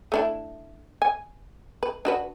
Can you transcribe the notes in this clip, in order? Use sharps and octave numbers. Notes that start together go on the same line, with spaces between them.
A3 D4 E4
G#5
B4
D4 F#4 B4